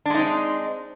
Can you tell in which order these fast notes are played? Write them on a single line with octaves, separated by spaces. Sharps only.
D4 G#3 D#4 C4